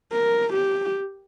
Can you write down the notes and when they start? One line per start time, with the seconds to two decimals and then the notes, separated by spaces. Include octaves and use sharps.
0.12 A#4
0.53 G4